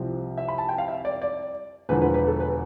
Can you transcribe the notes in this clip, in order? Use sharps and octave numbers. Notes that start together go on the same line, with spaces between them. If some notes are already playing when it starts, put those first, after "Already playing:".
Already playing: C2 C3 F3
E5
B5
A5
G5
F5
E5
D5
D5
E1 E2 D3 F3 B4
B4
B4
A4
B4